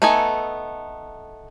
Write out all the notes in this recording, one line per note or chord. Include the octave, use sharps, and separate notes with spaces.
A3 B3 D#4 A4 G#5